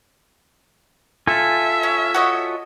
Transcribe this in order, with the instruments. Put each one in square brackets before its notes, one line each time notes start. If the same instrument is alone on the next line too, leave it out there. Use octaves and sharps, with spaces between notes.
[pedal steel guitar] F4 A4 G#5 [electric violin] E5
[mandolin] C#4
F#4 C#5 D#5